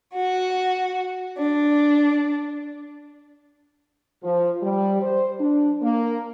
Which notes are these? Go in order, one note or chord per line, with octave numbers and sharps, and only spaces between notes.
F#4
D4
F3
G3
C5
D4
A#3